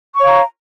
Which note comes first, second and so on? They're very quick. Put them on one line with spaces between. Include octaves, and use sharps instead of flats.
C#6 C#5 F5 A#5